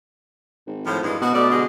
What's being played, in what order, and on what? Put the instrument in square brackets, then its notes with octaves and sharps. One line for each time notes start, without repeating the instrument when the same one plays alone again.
[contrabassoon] G#1
[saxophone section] A2 F3
G2 E3 G#3
[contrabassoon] B2 [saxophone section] F#4
[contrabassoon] B2 [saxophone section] A3 D5
[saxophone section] D3 G3 G#3